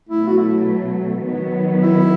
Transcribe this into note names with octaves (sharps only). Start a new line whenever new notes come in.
B2 F#3 A3 E4
F#4
E4
D#3 F#3 B3
E4